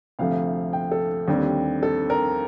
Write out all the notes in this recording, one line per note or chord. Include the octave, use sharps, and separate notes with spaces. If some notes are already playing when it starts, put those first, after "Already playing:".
D2 C3 F3 A3 F5
G5
A4
D#2 D3 G3 C4
A4
A#4